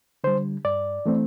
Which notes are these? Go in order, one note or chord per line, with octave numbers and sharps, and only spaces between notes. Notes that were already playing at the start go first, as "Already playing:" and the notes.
D3 G3 C5
G2 D5
E3 A3 C4